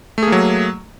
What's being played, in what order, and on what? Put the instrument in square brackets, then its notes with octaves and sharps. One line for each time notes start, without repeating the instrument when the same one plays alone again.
[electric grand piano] A3
G#4
A#3
F#3